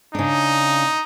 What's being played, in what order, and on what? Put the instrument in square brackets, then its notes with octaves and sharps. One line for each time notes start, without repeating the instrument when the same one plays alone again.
[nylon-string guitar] C#3 D4 [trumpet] D#4